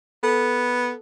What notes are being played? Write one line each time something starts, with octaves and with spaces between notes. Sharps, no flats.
B3 A4